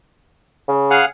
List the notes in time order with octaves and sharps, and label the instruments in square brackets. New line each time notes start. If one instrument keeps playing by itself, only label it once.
[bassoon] C#3
[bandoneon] G#4 F5 F#5